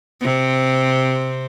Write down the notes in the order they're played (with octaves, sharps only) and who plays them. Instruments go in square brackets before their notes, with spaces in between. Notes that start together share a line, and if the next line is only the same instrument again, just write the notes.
[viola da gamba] C3 C4